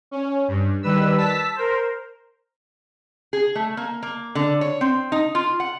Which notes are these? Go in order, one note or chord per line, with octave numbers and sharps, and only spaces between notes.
C#4
G2
D#3 G3 B4 E6
A5 E6 B6
A#4 C5
G#4
A3
A#3
A#3
D3
C#5
C4
D#4
F4
F#5